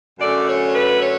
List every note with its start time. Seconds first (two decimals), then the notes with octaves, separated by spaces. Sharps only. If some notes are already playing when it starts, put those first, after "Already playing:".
0.19 F#2 D3 A3 C#4 D5
0.47 C#5
0.73 B4
1.00 C#5